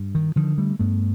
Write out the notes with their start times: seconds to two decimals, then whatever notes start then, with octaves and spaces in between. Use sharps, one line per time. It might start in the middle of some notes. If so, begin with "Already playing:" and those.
Already playing: G2
0.15 D#3
0.36 D3 D#3 F3
0.58 G3 A3
0.79 G2 A3 B3